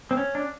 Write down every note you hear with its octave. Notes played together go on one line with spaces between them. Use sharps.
C4
C#4
D4